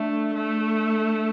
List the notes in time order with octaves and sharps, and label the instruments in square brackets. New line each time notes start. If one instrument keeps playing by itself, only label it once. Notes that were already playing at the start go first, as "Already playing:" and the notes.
Already playing: [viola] A3 [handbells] D4 A4 E5
[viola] A3